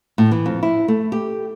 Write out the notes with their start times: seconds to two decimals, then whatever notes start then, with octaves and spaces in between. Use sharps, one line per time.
0.18 A2
0.31 E3
0.46 F2
0.63 E4
0.88 A3
1.12 G4